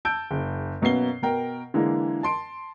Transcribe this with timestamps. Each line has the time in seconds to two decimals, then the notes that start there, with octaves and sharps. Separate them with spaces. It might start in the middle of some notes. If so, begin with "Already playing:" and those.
0.05 A5 E6 G6 D7
0.31 F#1
0.82 F#2 B2 A#3 B3 C7 G7
1.23 B2 A#4 G5
1.74 D3 E3 G#3 A#3
2.23 A5 C6 D7